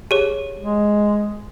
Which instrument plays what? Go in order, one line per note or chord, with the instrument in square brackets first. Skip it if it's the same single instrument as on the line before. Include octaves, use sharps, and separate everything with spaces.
[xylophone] G4 G#4 C#5
[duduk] G#3